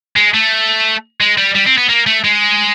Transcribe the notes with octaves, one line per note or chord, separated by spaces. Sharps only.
G#3
A3
G#3
G3
G3
C4
B3
A#3
A3
G#3